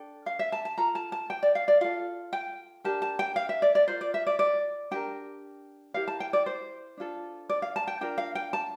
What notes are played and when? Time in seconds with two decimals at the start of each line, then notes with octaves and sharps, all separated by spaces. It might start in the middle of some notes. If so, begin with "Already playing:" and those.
Already playing: D4 A4 G5
0.26 F5
0.39 E5
0.52 A5
0.65 A5
0.78 F4 A4 A#5
0.95 A5
1.12 A5
1.30 G5
1.43 D5
1.55 F5
1.68 D5
1.81 F4 A4 F5
2.33 G5
2.84 D4 G4 A#4 A5
3.02 A5
3.19 G5
3.36 F5
3.49 E5
3.62 D5
3.75 D5
3.88 F4 A#4 C5
4.01 D5
4.14 E5
4.27 D5
4.39 D5
4.91 D4 G4 A#4 G5
5.94 E4 G4 A#4 F5
6.08 A5
6.20 G5
6.33 D5
6.46 C5
6.97 D4 F4 A4
7.49 D5
7.62 F5
7.76 A5
7.87 G5
8.01 D4 F4 A#4 G5
8.18 F5
8.35 G5
8.53 A5